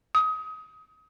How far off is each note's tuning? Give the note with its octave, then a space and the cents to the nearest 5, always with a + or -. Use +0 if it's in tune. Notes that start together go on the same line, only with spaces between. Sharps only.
D#6 +25